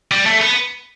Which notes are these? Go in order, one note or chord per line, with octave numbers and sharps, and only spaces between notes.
G3
A3
B3